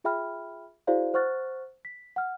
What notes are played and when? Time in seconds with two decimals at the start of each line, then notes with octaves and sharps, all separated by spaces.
0.04 F4 G#4 E5 G5 B5 F6
0.87 E4 F#4 G#4 C5 D5 F5
1.14 C5 F#5 C#6 F6 F#6 A6
1.85 B6
2.16 F#5 F6